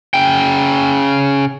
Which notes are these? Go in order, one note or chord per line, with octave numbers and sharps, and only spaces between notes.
C#3 G5